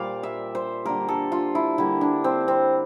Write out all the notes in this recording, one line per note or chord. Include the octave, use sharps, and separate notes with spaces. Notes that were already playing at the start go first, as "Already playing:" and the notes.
Already playing: A#2 G3 A#3 C5 D5 F5
E5
C5
D3 G3 A#3 A#4
A4
F4
E4
D3 G3 A#3 E4
D4
C4
C4